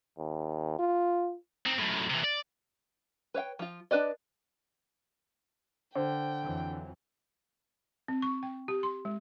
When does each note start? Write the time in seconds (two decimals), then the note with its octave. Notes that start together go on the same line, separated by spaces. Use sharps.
0.18 D#2
0.79 F4
1.66 C4 D#4
1.78 F#2 A2
2.10 C3 E3
2.24 D5
3.34 B4 C#5 F5 G5
3.59 F3 F4
3.91 D4 B4 D5 D#5
5.95 D3 C5 G5
6.43 F2 E3 F#3
8.08 C4
8.22 C#6
8.43 G5
8.68 G4
8.83 C6
9.05 G#3